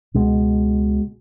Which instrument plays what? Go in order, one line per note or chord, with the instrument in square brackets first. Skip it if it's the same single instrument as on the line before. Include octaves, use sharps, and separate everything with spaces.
[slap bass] C#2 B2 G#3